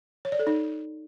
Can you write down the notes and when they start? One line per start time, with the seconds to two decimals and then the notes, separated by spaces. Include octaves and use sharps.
0.25 C#5
0.32 D5
0.39 A4
0.47 D#4